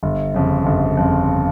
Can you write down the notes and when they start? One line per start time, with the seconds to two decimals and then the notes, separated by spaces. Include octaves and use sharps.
0.03 G1
0.34 F2 C#3
0.66 G1
0.97 F2 C#3